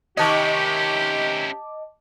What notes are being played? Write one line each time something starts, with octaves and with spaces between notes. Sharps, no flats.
C3 D#3 C#4 E4 G4 D#5 A5 D6